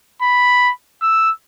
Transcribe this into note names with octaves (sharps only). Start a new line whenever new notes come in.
B5
E6